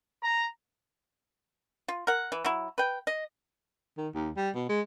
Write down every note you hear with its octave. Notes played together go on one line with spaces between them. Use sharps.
A#5
F4
A#4 F#5
E3
F#3 E4
B4 G5
D#5
D#3
D#2
G3
B2
G#3